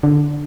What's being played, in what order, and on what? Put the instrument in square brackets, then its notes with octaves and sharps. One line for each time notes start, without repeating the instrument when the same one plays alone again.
[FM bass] D3